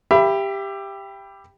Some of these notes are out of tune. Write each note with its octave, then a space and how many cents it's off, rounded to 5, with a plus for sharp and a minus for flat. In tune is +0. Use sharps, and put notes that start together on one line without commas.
G4 +10 E5 +25 B5 +0